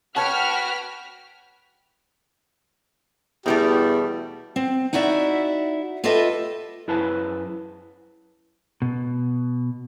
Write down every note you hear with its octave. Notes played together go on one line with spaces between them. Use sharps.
F#4 B4 C#5 F#5 G5 A5 F6 B6
E2 B2 G3 A3 G4
C4
D#4 E4 F#4 D5 E5
F4 G4 A4 B4 D#5 E5
F#2 E4 G#4 B4 C5 A5
B2